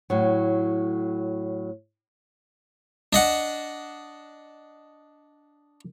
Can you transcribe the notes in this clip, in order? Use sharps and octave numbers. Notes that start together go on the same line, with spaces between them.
A2 F#3
D4 D#5 F#5